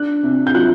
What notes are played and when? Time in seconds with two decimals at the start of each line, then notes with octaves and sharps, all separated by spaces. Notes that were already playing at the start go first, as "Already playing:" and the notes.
Already playing: D4 F#6
0.23 C3
0.47 G6
0.55 F#3 F#6